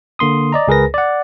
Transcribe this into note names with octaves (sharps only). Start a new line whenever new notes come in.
D3 A#3 C6 D#6
D5 D#5 A#5
C#2 G#4 A#4 B4 A#6
D5 F#5